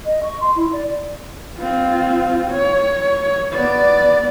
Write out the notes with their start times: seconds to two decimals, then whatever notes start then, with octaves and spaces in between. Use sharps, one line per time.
0.05 D#5
0.23 C#6
0.40 C6
0.55 E4
0.72 D5
1.58 C4 F4
2.51 C#5
3.53 B3 D5